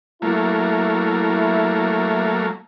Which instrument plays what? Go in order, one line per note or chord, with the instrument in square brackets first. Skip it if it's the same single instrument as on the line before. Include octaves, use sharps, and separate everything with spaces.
[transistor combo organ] F#3 A3 A#3 [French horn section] E4